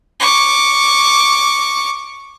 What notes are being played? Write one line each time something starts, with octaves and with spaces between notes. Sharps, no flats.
C#6 D6